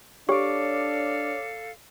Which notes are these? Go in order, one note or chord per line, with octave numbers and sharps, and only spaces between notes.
D4 G4 A4 C#5 F5 D6